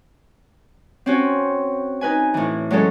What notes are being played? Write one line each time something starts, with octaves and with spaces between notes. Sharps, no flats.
C4 C#4 F#4
D#4 B4 G#5
A2 E3
F#3 G#3 C#4 A4